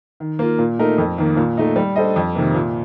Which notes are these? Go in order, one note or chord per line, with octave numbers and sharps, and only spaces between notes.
D#3
A#3 F4
A#2
A3 D#4 A#4
F2
D#3 A#3
A#2
A3 D#4
G3
D4 A4 C5 D#5
F2
C3 D#3 A#3
A#2